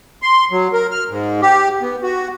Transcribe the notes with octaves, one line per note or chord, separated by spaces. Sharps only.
C6
F#3
A#4
F6
G#2
G4
B3
F#4